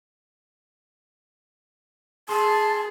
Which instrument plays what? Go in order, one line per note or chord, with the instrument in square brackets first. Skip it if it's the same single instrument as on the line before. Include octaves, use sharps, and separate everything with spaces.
[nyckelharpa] G#4 [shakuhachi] A5 [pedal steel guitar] C6